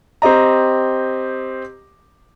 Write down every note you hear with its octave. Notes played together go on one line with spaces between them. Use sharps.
C4 G4 D#5 A#5